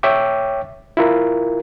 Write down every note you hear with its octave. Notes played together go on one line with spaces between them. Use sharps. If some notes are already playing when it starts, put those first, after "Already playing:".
C#5 E5 G5 D6
E4 F4 A#4